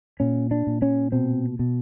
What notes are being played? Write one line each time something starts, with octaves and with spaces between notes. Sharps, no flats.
A#2 C#4
D4
A#2
C#4
B2 C4
B2